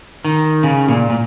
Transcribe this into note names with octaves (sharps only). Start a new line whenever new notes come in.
D#3
C#3
A#2
A#2